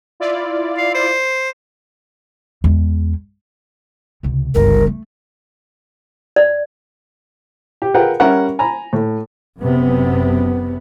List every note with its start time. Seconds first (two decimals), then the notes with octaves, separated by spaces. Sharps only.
0.20 E4 F4 D5
0.78 F5
0.95 C5
2.64 E2 G#3
4.23 C#2 C3
4.55 G1 C#2 A#4
4.87 A3
6.36 D5
7.82 G4
7.94 F4 G#4 A#4 B4 F#5 G5
8.20 G3 C#4 A#4 E5 F#5
8.59 G#5 A#5 B5
8.93 A2
9.59 F#1 F#2 C3 B3